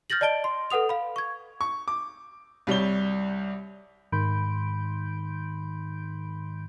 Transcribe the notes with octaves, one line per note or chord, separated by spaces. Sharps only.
F6 G6 A6 A#6 F#7
D5 D#5 A5 D7 G7
C6
A4 B4 F#5 D#6 F7
F5 B5
C#6 G#6
C#6
D6
C2 G3 C#5 G7
G#2 D#3 B5 C6 G6 D7